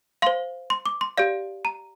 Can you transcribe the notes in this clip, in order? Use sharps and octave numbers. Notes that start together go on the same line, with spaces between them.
C5 F5 C6
C6
D6
C6
G4 D5 F5
A#5